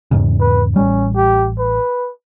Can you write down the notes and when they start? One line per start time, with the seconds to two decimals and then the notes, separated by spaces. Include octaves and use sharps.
0.11 E2 G#2 C#3
0.41 B4
0.76 A1 G3 C#4
1.15 G4
1.59 B4